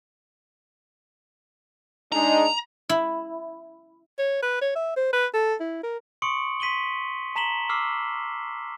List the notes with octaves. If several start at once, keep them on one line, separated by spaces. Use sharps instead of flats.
G#3 D4 D#4 A#5
E4
C#5
B4
C#5
E5
C5
B4
A4
E4
A#4
C6 C#6 D#6 C#7 D7 F#7
C6 B6 D#7 F#7 G7
A5 A#5 B6 E7 F#7 G7
D6 E6 F6 C7